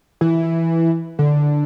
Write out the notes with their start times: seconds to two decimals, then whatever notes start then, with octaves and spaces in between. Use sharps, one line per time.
0.21 E3
1.19 D3